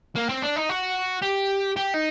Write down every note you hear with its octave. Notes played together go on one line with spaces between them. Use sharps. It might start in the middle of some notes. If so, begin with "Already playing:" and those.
A#3
C4
D4
D#4
F#4
G4
G4
D#4